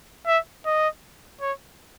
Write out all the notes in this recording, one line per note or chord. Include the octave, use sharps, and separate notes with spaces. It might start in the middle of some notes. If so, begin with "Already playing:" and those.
E5
D#5
C#5